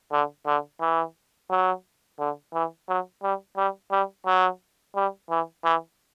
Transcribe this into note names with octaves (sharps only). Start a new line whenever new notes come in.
D3
D3
E3
F#3
D3
E3
F#3
G3
G3
G3
F#3
G3
E3
E3